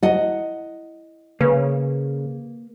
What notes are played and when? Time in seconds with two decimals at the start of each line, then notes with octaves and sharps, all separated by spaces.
0.03 E4 D#5 F#5
1.41 C#3 A#3 B4